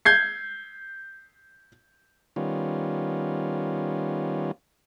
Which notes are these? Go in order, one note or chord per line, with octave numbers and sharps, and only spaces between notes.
G6 G#6 C7
D#3 G3 B3 C#4 F4